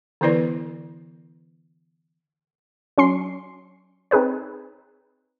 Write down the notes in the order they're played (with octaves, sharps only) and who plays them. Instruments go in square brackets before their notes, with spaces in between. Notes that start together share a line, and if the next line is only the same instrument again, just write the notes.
[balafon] D3 E3 B3 E4 B4 D5
[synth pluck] F#3 C#4 C6 C7
C4 D#4 G#4 B4 C#5